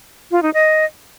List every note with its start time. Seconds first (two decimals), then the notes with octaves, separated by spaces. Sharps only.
0.31 F4
0.43 D#4
0.54 D#5